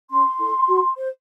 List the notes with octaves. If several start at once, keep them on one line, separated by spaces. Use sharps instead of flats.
C#4 C6
E4 A4
F#4
C5